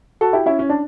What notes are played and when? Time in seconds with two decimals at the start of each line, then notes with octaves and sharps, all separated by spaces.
0.21 F#4 A4
0.33 E4 G4
0.46 C#4 E4
0.59 C#4
0.70 D4